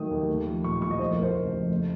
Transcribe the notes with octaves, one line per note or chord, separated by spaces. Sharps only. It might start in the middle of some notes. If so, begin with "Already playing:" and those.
Already playing: D#3 F#3 A3 D#6
D#2
A3
F3
A#2 C#6
C2 C#6
D#5
F2 C5
A#4
A3 C5
C#3
F2
A3